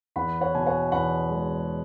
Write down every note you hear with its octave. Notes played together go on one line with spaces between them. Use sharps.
E2 F#5 B5
C#5 F#5
B2 G#5
C#5 F#5
E2 F#5 B5
G#3